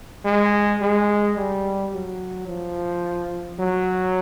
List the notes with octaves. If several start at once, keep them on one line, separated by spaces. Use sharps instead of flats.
G#3
G#3
G3
F#3
F3
F#3